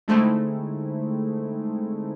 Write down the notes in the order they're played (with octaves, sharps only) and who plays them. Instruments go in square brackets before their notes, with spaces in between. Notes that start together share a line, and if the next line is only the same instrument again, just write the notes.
[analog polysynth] D3 G#3 A3 C4 D#4 E4